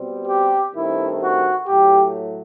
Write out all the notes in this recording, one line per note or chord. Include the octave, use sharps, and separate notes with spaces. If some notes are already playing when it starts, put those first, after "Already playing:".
Already playing: B2 G3 C4
G4
G2 D#3 A3 C4 E4
F#4
A2 F#3 A3 G4